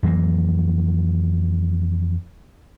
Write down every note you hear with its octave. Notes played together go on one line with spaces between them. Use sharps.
F2 E3 F#3 A#3